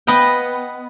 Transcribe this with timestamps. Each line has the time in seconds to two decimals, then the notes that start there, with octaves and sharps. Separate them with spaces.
0.07 B3 B4 D#5 G5